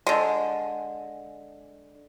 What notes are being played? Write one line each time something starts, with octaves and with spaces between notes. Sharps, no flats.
D3 G#3